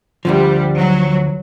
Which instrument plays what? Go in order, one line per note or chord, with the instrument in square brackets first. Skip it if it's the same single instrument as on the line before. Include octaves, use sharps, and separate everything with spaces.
[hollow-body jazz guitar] D2 D3 F3 [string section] G3
[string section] F#3